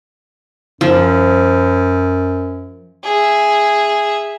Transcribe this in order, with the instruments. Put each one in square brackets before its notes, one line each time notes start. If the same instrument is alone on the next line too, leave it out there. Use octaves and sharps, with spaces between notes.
[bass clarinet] F#2 [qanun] F3
[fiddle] G#4 E5